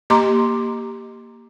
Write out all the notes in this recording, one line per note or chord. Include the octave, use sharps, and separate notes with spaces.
A#3 G4 D#5 A#5 C6 D6